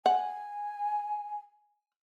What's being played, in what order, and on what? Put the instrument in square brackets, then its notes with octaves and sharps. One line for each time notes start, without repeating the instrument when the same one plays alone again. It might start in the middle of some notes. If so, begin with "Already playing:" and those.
[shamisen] F#5 [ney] G#5